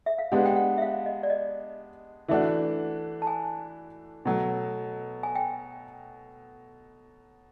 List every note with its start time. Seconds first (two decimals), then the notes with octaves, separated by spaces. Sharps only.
0.06 E5
0.19 F5
0.32 G#3 B3 D4 G4 F#5
0.46 G5
0.56 F#5
0.78 E5
0.82 F5
1.06 D#5
1.23 D5
1.30 D#5
2.28 E3 A3 D4 F#4 E5
3.22 A5
3.27 G#5
4.25 B2 F#3 A3
5.23 G#5
5.35 G5